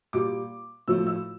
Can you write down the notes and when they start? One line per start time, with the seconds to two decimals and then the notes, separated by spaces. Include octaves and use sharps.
0.13 A#2 G3 D6
0.88 A2 F3 A3 E6
1.07 E6